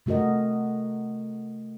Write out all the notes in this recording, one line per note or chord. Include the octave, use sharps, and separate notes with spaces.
C3 A3 F#4 A#4 D#5